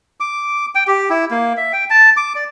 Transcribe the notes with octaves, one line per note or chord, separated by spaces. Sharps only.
D6
G5
G4
E4
A#3
E5
G5
A5
D6
D5